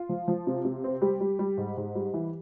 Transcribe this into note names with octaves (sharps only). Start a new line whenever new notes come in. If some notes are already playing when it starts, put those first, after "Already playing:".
Already playing: F4
F3
F3
C3
C3
C4
G3 G4
G3
G3
G#2
G#2
G3
E3